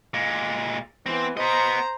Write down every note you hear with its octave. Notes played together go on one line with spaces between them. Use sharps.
A#2 G#3
E3 B3 C4 C5
B3 C5 D#5 A#5